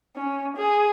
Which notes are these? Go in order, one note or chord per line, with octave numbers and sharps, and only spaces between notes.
C#4
G#4